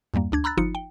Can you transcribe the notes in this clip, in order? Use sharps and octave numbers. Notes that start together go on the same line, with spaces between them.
E2 G2 G3 A#3
D2 D4 G#6
A#5 B5 E6 F#6 A6
G1 F3 D#4 F4 C#7
G5